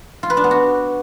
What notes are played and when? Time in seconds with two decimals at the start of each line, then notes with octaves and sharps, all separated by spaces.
0.23 F4
0.30 B4
0.37 D4
0.44 B3
0.51 F#4